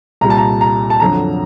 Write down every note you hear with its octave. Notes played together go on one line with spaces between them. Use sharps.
C2 A#2 G3 A#5
A5
A#5
A#5
A5
F2 D3 F#3 A#5